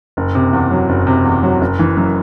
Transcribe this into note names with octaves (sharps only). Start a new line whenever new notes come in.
F#1
C3
E2
F#3
F#1
C3
E2
F#3
F#1
E3
F#2